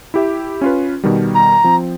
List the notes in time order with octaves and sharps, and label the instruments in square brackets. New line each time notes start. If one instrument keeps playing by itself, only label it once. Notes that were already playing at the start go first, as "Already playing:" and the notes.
[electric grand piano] E4 G4 E5
C#4 F4 B4
B2 D#3 G3
[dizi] A#5
[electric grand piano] F3 C4